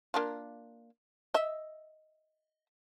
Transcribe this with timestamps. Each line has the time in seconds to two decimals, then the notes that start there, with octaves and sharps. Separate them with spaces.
0.14 A#3 D4 F4
1.34 D#5 E5